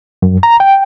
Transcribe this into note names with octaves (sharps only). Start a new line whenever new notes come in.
F#2
A#5
G5